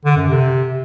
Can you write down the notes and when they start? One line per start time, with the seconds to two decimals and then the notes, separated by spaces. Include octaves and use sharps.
0.05 D3
0.17 F#2
0.28 C3